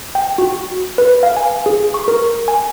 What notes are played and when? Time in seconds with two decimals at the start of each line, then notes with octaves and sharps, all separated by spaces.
0.15 G5
0.38 F#4
0.98 B4
1.23 F5
1.37 G#5
1.66 G#4
1.94 C#6
2.08 A#4
2.48 G#5